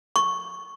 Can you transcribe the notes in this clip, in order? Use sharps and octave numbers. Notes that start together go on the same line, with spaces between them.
C#6